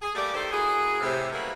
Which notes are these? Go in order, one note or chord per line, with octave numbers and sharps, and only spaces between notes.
G#4
G3 A3 A#3 G4 D5
D#3 A3 G4 A4 C5
A#3 E4 F#4 G#4
A2 C3
F#3 G3 A#3 B3 C#4 E4